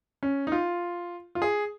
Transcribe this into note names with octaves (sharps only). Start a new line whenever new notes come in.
C#4
D#4
F4
F4
G#4